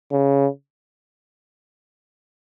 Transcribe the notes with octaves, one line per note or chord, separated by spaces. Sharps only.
C#3